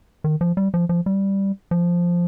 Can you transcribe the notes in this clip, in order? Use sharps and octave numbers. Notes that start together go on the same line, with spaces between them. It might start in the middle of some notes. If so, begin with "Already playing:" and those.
D#3
F3
G3
F3
F3
G3
F3